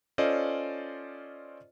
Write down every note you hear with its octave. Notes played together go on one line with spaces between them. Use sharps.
C#4 F4 A4 C5 D5 D#5